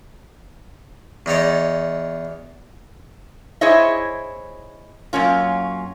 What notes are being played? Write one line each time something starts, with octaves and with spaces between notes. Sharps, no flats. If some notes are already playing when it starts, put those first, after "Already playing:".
E2 D#4 C#5 D5
E4 G#4 C5 C#5 D#5 E5
F#2 A#3 C#4 F4